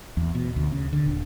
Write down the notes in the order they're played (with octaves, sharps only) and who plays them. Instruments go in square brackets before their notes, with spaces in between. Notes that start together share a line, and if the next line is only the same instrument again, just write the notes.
[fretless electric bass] E2
B2
D2
C#3
D3
D#1